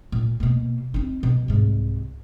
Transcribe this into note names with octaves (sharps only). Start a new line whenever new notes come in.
A#2
B2 A#3
C4 D#4
B2
C2 G#2